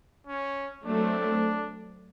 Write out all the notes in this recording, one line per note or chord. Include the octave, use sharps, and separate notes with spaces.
C#4
F#3 A3 C4 D4